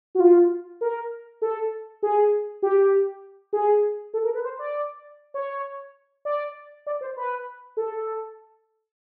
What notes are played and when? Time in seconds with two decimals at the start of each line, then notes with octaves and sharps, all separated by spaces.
0.15 F#4
0.20 F4
0.81 A#4
1.42 A4
2.03 G#4
2.62 G4
3.53 G#4
4.14 A4
4.24 A#4
4.35 B4
4.44 C5
4.59 D5
5.34 C#5
6.25 D5
6.87 D5
7.01 C5
7.17 B4
7.77 A4